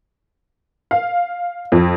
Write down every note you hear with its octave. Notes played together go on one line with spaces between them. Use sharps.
F5
F2